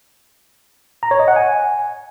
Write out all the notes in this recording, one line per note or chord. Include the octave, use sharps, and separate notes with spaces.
A#5
C#5
D#5
F#5
G#5